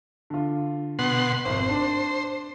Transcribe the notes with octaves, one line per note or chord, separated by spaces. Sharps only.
D3 F4
B2 F#5 C6
G#1 F2 C5
D4